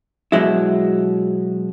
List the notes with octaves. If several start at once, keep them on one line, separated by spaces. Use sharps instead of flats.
B2 F#3 G#3 E4